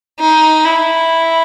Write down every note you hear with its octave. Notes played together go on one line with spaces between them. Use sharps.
D#4
E4